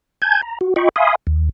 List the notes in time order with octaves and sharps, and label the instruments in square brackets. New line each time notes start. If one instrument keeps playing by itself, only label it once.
[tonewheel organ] G#5 A5 G6 G#6
A#5
F#4
F4 D#5 G5 B5 C#6
E5 F5 G#5 B5 C6 D#6
D#2